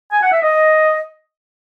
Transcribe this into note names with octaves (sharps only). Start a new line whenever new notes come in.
G#5
F#5
E5
D#5